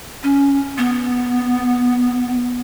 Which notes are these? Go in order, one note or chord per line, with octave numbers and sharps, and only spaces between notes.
C#4
B3